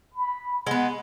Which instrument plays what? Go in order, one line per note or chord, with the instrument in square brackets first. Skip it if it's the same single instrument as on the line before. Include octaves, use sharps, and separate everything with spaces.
[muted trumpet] B5
[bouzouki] G#3 B3 [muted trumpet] F#5